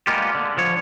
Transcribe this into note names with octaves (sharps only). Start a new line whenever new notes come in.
G3 G#3 A#3 B3 F4 G4
D3
D3 F3 C#5